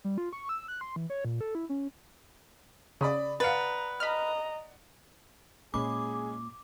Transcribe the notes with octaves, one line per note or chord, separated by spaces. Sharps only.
G3
F4
C#6
E6
F#6
C6
E3
C#5
A#2
A4
E4
C#4
C#3 D5 B5 D#6
B4 D5 F5 F#5 A#5 A6 C#7
D#5 A#5 B5 F6
A#2 G#3 C#4 G#4 B5 D6